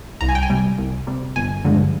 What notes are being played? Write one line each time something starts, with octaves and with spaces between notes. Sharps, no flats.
C2 A#5
G#5
G5
G#5
C3 G3
C2
C3 G3
G1 G#5
G2 D3 F3 G#3